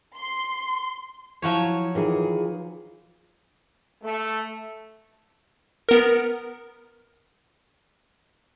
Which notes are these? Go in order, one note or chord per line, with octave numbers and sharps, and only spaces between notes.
C6
F3 F#3 E4 C#5
D#3 E3 F4 G#4
A3
B3 A#4